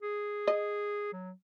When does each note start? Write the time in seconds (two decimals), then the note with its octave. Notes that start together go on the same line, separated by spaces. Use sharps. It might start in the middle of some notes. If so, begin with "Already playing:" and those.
0.03 G#4
0.48 D#5
1.13 F#3